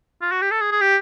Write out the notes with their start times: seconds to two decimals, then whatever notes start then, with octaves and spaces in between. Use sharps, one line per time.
0.22 F4
0.32 F#4
0.42 G4
0.51 A4
0.61 G#4
0.71 G#4
0.81 G4